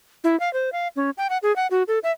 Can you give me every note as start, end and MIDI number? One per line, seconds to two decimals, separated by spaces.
0.24 0.38 64
0.40 0.52 77
0.53 0.70 72
0.73 0.88 77
0.96 1.10 61
1.18 1.27 79
1.30 1.38 78
1.43 1.55 68
1.56 1.67 78
1.71 1.83 66
1.88 1.99 69
2.03 2.12 76